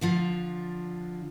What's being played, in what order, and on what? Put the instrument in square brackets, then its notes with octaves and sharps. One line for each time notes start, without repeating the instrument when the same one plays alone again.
[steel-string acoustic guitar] D3 F3 F4